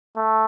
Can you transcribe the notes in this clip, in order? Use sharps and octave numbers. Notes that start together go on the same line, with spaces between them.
A3